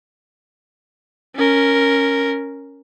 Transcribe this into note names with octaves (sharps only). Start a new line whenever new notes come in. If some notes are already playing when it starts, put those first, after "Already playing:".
C#4 A#4